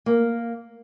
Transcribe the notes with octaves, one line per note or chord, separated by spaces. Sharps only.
A#3